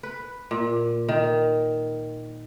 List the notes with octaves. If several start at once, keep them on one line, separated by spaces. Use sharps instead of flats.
B4
A#2
D#3